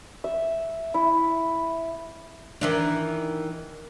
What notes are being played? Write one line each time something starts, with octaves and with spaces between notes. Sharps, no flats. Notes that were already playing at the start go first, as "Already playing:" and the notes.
E5
E4
D#3 E3 D4